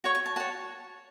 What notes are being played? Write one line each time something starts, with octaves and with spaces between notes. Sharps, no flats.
F#4 C#5 C#6
C#6
A5
F#4 C#5 A5